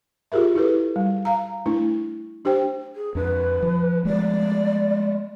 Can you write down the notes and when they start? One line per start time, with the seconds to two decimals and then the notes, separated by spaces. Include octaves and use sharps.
0.32 F4 G4 G#4 A#4 E5
0.55 E4 G4 A4 B4
0.96 G3
1.25 F5 A#5
1.66 A3 D4 E4
2.45 D4 G4 C5 G5
2.95 G#4
3.15 F2 D4 B4
3.62 F3
4.05 F3 G#3 A3 D5